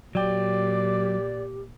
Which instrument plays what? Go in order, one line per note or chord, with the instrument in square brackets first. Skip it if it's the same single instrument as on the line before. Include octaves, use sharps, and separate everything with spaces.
[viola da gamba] A#2 [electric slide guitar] F#3 G5 [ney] G4 [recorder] D5